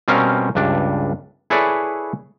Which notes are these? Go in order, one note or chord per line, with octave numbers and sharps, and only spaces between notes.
B2 G3 C4 C#4 A#4 F5
C#2 G2 D4
E4 G#4 A4 B4 C#5 D5